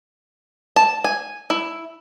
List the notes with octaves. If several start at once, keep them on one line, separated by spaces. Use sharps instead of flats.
A5
G#5
E4